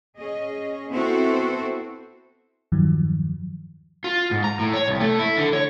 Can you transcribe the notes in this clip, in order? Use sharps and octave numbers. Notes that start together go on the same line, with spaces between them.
C#4 G#4 D#5
B3 C4 E4 F#4 A4 C5
E2 G2 D#3 F3 F#3
F4
G#2
A#5
A2
C#5
C2
A3
E4
D3
C#5